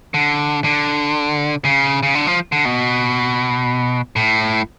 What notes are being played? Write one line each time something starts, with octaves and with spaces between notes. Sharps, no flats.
D3
D3
C#3
C#3
D3
F3
D3
B2
A2